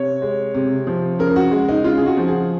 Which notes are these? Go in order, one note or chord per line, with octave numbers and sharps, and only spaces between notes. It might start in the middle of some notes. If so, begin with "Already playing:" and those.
Already playing: C3 C#5
G#3
C3
F3
C#3 A#4
F#4
G#3
D#4
C#3 F4
G#4
F#4
F3
G#4